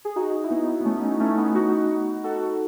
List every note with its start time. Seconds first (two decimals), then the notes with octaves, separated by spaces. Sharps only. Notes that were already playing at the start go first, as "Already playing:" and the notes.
0.05 G#4
0.16 D#4 F#4
0.44 E4
0.50 B3 D#4
0.81 B3
0.85 A3 C#4
0.97 D#4
1.02 A3 C#4
1.20 A3 C#4
1.38 B3 D#4
1.55 D#4 F#4
2.24 F#4 A4